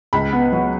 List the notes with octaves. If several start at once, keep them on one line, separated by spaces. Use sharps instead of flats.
C#2 B5
B3
F#3